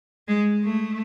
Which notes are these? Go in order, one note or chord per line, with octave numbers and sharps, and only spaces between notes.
G#3
A3